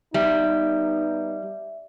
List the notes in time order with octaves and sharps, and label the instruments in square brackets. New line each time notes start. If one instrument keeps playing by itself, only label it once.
[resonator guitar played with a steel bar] G3 [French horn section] B3 D#4 [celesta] E5